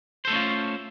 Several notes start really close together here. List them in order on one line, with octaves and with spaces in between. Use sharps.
C5 A4 A3 C#4 F4